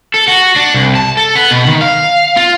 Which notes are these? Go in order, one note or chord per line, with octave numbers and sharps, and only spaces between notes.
A4
F#4
D4
C2
A5
A4
B3
B2
D#3
F5
F4